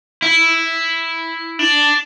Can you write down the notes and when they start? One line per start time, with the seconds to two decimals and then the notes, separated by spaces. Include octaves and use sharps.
0.22 E4
1.59 D4